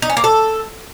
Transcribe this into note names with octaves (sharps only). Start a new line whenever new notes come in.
D#4
C#4
A#3
A4